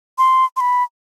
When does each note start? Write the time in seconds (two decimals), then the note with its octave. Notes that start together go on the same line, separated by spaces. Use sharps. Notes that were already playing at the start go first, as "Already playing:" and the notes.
0.18 C6
0.56 C6
0.60 B5